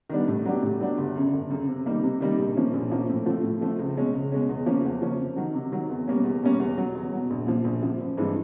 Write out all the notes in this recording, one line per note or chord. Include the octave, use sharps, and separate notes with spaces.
D#3 G3 B3 D4
A2
F#3 B3 D4 G4
A2
F#3 B3 D4 G4
G1
F#2 C#3
G1
F#2 C#3
C3
D#3 G3 A#3 D#4
C3
D#3 G3 A#3 D#4
A#1
A#2 F3 A#3 C#4
A#1
A#2 F3 A#3 C#4
A2
F3 A3 C4 F4
A2
F3 A3 C4 F4
C#2
B2 G#3 C#4
C#2
B2 G#3 C#4
E2
C#3 F3 A#3 C#4
E2
C#3 F3 A#3 C#4
C3
D#3 F#3
C3
D#3 F#3
E2
B2 G3 A#3 C#4
E2
B2 G3 A#3 C#4
E2
B2 F#3
E2
B2 F#3
A#1
A#2 F3
A#1
A#2 F3
A1
G2 E3 G#3 C4